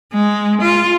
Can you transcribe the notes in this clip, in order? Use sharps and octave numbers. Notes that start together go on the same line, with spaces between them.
G#3
F4